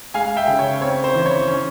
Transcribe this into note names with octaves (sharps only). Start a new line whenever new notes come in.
G#3 F5 G#5
E5 G5
C#3
C#5
C4 C#5
C5
E3
C#5
C#4